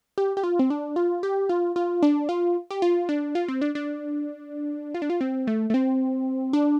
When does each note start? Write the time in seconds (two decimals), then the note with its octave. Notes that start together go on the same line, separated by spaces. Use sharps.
0.18 G4
0.37 G4
0.43 F4
0.59 C4
0.70 D4
0.96 F4
1.23 G4
1.49 F4
1.76 F4
2.03 D4
2.29 F4
2.71 G4
2.82 F4
3.09 D4
3.35 F4
3.48 C4
3.62 D4
3.75 D4
4.94 F4
5.02 D4
5.10 F4
5.21 C4
5.47 A3
5.70 A3
5.74 C4
6.53 D4